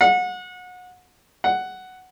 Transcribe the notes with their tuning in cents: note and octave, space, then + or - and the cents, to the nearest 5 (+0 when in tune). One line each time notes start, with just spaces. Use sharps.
F#5 -30
F#5 +5